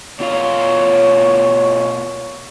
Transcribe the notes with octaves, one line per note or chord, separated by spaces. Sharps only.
B2 F4 C#5 F5